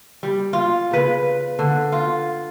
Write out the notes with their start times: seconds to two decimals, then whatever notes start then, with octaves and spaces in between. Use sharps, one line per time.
0.23 G3
0.53 F4
0.91 C#3 B4
1.59 D3
1.92 F4